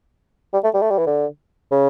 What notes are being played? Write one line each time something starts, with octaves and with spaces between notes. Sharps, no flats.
G3
A3
G3
A3
G3
E3
D3
C#3